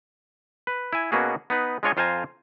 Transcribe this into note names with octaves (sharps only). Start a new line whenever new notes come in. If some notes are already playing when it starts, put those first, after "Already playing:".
B4
E4 G#5
B2 A#3 B3 C#4 F#4 G#4
B3 D#4 B4
G#3 D4 F4 C#5 D#5 G#5
F2 F4 C5 F5 G#5 A#5